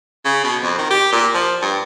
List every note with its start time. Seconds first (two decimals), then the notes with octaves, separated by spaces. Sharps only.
0.25 C#3
0.44 B2
0.63 F2
0.78 D#3
0.91 G4
1.12 A#2
1.34 F3
1.62 G2